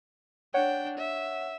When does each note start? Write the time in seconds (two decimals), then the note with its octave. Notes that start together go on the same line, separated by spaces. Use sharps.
0.54 D4 C#5 F#5 G5
0.98 E5